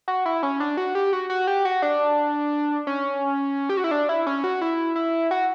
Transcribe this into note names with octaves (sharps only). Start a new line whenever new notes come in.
F#4
E4
C#4
D4
F#4
G4
F#4
F#4
G4
F#4
D4
C#4
G4
F#4
E4
D4
E4
C#4
F#4
E4
E4
F#4